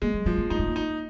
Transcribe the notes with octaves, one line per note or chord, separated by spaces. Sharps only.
G#3 A#3
F#3
F3 F#3
A#3
A#3 D#4
G#3
A#3
D#4